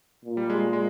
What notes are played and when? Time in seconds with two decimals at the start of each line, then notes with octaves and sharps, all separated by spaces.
0.25 A#2
0.37 G3
0.50 G#3
0.61 G#3
0.73 G#3